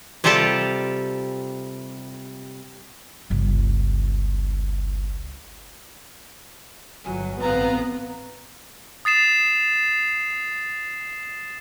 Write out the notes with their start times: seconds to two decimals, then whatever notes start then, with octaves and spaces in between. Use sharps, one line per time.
0.24 C3 G3 F4 G4 A4 A5
3.30 G1 C#2
7.04 G1 F#3 G#5
7.42 A1 B3 C4 B4 F5 A#5
9.05 D#6 A6 C7 E7